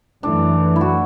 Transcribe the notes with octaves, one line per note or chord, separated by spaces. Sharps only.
F#2 E3 A3 D4
E4
F#4